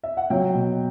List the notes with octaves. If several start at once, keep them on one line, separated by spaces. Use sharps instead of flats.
E5
F#5
F#3 G5
B2